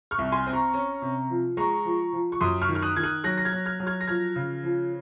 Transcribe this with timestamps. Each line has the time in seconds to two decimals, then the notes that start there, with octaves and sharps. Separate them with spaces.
0.11 C#6 F6
0.18 C2
0.32 G#5 C6
0.46 C4
0.53 A#5 C#6
0.74 C#4
1.02 C3
1.30 F3
1.57 G#3 A#5 C#6
1.85 F3
2.13 F3
2.32 C#6
2.41 F#2 C6 D#6
2.62 C#6 F6
2.69 D#3
2.75 F6
2.82 D#6 F#6
2.96 D#3 G#6
3.03 D#6 F#6
3.24 F#3 F#6 A#6
3.37 A#6
3.45 F6 G#6
3.52 F#3
3.66 F6 G#6
3.80 F#3
3.87 F6 G#6
4.01 A#6
4.07 F3 F6 G#6
4.36 C#3
4.63 F3